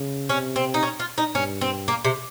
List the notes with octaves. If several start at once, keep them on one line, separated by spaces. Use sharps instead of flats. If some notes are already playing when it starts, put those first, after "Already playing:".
Already playing: C#3
C3 C#4
C4
D#4
C#4
F4
D#4
G2 C#4
C4
A#3
C3